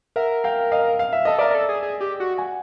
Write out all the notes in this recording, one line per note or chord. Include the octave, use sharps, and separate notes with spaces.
A#4 E5 F#5
F5 G5
D#5 F5
F5
E5
A4 D#5
A#4 D5 E5
A#4
A4
G#4
G#4
G4
F#4
F#5 G#5